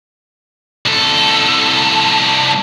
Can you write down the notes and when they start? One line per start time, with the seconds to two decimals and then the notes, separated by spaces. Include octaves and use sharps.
0.85 C2 A4